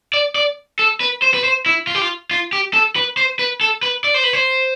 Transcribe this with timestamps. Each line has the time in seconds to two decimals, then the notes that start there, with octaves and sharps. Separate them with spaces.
0.14 D5
0.36 D5
0.79 A4
1.00 B4
1.22 C5
1.34 B4
1.44 C5
1.66 E4
1.87 F4
1.95 G4
2.02 F4
2.31 F4
2.53 G4
2.74 A4
2.96 B4
3.17 C5
3.39 B4
3.61 A4
3.83 B4
4.04 D5
4.14 C5
4.24 B4
4.33 C5